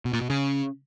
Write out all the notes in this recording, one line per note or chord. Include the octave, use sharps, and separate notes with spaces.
B2
A#2
B2
C#3